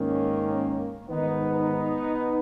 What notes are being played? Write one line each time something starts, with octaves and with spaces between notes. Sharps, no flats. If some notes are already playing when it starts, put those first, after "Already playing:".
Already playing: G#2 D#3 A#3 C#4
G#2 D#3 B3 D#4